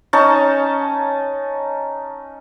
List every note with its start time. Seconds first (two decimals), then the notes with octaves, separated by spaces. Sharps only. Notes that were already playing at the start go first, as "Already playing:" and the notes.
0.13 C#4 D#4 A5